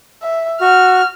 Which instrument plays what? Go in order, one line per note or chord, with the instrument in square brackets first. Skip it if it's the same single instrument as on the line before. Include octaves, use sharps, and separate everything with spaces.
[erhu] E5
[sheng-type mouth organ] F#4 [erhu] F6